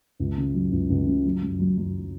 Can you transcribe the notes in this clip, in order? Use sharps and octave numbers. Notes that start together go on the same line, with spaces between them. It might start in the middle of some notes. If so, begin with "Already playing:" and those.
C#2
C#3
F#3
C#2
C#2
C#3
F#3
F#2
F#3
F#3